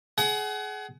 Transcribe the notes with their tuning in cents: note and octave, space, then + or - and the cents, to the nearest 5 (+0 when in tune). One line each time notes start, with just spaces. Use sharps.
G#4 +30 F#5 +35